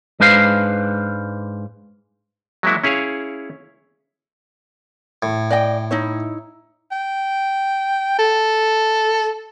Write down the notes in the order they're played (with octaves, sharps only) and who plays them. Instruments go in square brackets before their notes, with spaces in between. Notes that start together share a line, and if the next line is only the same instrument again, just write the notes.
[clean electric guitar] G#2 G#3 D4 B4 C5 F5
[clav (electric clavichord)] F#3 G#3 A#3 E4 F#4
C#4 E4 G#4 C#5 F5
[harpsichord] A2
[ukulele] D5 D#5 G5
D#4 E4 C#5
[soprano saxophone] G5
A4